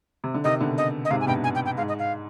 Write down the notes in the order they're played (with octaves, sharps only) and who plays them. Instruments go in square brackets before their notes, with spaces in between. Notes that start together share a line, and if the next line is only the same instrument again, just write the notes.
[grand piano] C3
D3
[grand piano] C3 D#3 [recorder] D#5
[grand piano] B2 D3
[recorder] D#5
D#5
[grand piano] G#2 C3 [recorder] F5
[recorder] G#5
[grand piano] G2 B2 [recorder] G5
[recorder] G#5
G5
G5
[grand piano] G#2 [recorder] F5
[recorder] D#5
F5